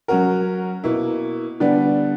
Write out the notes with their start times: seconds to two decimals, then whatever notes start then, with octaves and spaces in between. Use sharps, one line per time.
0.08 F#3 C#4 F#4 A#4
0.84 B2 A#3 E4
1.60 D3 G3 B3 D4